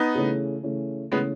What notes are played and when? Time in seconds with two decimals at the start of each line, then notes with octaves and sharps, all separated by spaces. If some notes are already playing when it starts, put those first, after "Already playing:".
Already playing: B3 D#4
0.15 C#3 E3 A3 C#4
0.63 C#3 E3 A3 C#4
1.12 C#3 E3 G#3 A3 B3 C#4